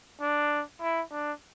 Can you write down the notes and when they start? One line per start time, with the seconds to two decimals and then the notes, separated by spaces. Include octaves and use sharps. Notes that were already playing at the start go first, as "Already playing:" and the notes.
0.21 D4
0.81 E4
1.11 D4